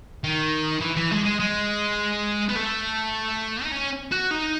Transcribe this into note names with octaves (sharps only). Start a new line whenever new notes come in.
D#3
E3
E3
G#3
G#3
G#3
B3
A3
D#4
C#4
F#4
D#4